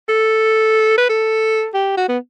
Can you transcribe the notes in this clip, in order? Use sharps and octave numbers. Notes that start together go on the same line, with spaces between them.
A4
B4
A4
G4
F#4
B3